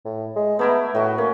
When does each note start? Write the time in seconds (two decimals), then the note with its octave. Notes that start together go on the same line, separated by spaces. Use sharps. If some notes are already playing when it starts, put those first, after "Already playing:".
0.05 A2
0.36 G#3
0.59 A3 B3 E4 A#4
0.95 A2 F#4 D#5
1.18 A#3 C#4